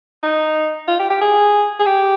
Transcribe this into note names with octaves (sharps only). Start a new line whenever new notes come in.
D#4
F4
G4
G4
G#4
G#4
G4